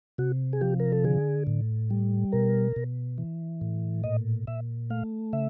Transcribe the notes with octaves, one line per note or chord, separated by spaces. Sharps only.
C3 F#4
G#4
F3 G4
A#4
A4
D3 G#4
A2
G3
B2 A#4
B2
E3
A2
A#2 D#5
A#2 E5
A3 F5
C#3 E5